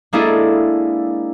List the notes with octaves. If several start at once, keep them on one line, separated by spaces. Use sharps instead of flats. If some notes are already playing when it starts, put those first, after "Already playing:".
G#3 A#3 D4 E4 G#4 A4